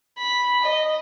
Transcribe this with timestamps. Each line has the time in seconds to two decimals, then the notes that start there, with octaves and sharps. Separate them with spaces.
0.18 B5
0.64 D#5